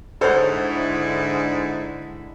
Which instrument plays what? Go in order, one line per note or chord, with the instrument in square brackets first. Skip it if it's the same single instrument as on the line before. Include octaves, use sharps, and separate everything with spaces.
[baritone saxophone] G#2 [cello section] D3 G#3 E4 [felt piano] A4 C#5 F#5 [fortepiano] C5